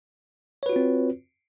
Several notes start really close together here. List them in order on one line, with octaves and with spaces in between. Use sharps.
C#5 B4 F#4 F4 C4